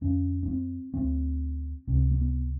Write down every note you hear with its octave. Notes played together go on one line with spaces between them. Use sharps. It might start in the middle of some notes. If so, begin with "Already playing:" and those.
F2 D3 C#4
C#4
C4
D2 D3 C4
C#2 C3 C4
A#3
B3